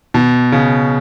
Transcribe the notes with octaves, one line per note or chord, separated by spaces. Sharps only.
B2
C#3